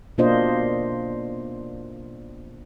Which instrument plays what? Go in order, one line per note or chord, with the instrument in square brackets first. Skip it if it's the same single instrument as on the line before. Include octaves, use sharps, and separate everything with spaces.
[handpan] B2 A#3 D4 F4 C5 D#5